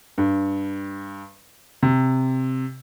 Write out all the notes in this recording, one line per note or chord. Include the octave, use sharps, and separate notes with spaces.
G2
C3